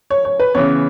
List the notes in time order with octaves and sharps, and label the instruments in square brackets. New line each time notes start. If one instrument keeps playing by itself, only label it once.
[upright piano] C#5
C#5
B4
[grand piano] C#3 E3 B3 [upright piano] C#5